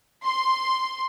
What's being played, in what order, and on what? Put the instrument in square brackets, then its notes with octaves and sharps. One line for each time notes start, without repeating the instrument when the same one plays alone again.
[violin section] C6